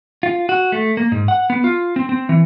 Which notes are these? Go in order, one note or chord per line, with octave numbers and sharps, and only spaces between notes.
F4
F#4
A3
A#3
G#2
F#5
B3
F4
C4
C4
E3